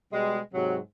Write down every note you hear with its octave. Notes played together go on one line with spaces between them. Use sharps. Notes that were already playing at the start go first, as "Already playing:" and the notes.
B2 G3 G#3
G#2 C3 F#3